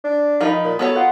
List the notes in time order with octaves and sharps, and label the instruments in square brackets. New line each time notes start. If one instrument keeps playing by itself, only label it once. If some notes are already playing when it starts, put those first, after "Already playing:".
[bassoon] D4
[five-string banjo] F3 D#4 [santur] A#4 D#5 B5
[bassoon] A#2
[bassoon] F#3 [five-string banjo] B3 A4 C#5
[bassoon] F4 [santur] F#5